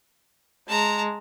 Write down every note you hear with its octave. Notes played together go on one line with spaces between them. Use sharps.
G#3 A5 A#5